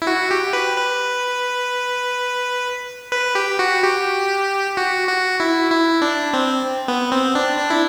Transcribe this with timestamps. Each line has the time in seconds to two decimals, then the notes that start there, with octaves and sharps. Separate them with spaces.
0.02 E4
0.07 F#4
0.31 G4
0.53 B4
0.77 B4
3.12 B4
3.35 G4
3.59 F#4
3.83 G4
4.77 F#4
5.08 F#4
5.40 E4
5.71 E4
6.02 D4
6.33 C4
6.88 B3
7.12 C4
7.35 D4
7.58 D4
7.70 E4